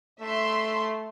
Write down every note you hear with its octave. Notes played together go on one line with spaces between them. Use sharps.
A3 E5 C6